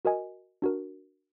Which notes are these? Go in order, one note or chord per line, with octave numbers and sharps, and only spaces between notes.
F#4 A#4 D#5 G#5
D4 F#4 A#4